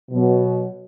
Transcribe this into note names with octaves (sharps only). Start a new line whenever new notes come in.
B2 F#3